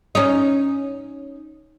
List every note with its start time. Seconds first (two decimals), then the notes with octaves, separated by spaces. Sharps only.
0.15 C#4 D#4